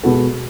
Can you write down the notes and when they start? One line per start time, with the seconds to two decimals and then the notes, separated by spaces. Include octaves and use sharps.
0.03 B2 G#3 B3 F#4 A4